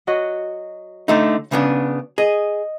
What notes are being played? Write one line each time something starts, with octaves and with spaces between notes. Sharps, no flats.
F#3 F#4 D#5
D3 A3 D#4
C#3 B3 D4
G#4 D#5